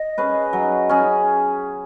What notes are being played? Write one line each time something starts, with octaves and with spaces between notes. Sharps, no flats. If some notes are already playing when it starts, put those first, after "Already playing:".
Already playing: D#5
C#4 G#4 B4
F#3
C#4 G#4